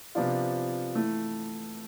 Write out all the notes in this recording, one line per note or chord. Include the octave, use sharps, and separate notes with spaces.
C3 F3 B3 D4 F4
E3 A3 E4